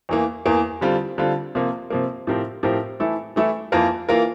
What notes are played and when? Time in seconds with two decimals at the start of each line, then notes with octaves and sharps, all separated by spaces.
0.09 E2 E3 A#3
0.45 E2 E3 A#3
0.81 D3 G3 C4 F4
1.18 D3 G3 C4 F4
1.55 C3 F3 A#3
1.90 C3 F3 A#3
2.27 A2 F3 C4 G4 A#4
2.63 A2 F3 C4 G4 A#4
3.00 E3 A3 E4 A4
3.36 E3 A3 E4 A4
3.72 F2 E3 A#3 F4 A#4
4.09 E3 A#3 F4 A#4